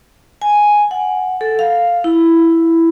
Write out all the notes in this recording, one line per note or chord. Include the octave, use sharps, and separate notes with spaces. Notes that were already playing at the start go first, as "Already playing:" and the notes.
G#5
F#5
A4
F5
E4